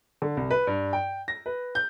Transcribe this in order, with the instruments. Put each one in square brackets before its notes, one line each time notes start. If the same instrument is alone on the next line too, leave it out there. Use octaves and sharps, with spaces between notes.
[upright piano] D3
C2
B4
G2
G5
A#6
B4
G6